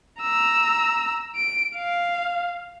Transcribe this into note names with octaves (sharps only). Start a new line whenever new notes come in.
A#5 E6
D7
F5